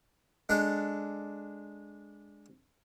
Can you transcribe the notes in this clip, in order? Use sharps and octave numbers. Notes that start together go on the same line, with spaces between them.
G#3 D4 A4 F#5